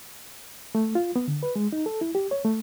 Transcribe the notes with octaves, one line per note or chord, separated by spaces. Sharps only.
A3
F4
B3
D3
B4
G#3
D#4
A4
E4
G4
C#5
A3